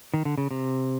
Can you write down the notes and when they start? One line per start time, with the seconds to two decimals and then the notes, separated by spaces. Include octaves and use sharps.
0.14 D#3
0.25 D3
0.38 C#3
0.51 C3